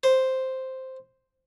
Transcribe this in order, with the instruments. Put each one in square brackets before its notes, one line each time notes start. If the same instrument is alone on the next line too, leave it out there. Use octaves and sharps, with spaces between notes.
[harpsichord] C5